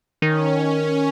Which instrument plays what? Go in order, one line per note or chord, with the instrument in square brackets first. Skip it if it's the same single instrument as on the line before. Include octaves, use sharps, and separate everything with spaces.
[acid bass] D#3 [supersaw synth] C#4